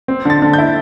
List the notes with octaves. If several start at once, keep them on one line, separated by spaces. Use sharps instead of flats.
C4
D3 A6
D3
E4 G6